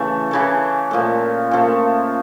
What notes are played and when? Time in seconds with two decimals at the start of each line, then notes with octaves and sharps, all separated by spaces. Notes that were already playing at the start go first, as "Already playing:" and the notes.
Already playing: C#3 E3 A3
0.31 C#3 E3 A3
0.91 A#2 F3 A3
1.51 A#2 F3 A3